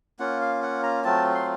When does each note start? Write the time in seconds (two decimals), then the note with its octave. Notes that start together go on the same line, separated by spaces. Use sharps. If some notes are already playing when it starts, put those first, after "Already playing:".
0.19 A#3 C#4 F4 F#5
0.41 F5
0.63 F#5
0.83 A#5
1.04 F#3 A3 C4 F4 A5
1.35 C6